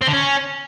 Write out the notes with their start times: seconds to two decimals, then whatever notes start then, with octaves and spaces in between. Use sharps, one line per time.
0.02 C4
0.07 D3
0.13 C#4